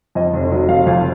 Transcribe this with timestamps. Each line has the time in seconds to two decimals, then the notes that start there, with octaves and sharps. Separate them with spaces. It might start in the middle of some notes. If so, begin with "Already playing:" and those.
0.15 F2 D#5
0.33 F1
0.51 F#3
0.69 F1 F5
0.86 F2 F5